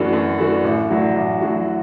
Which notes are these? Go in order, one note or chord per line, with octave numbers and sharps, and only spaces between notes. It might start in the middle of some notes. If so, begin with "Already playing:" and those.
Already playing: F#2 E3 A3 D4 F#4
F#2
E3 A3 D4 F#4
A1
A2 F#3 D4 F#4
A1
A2 F#3 D4 F#4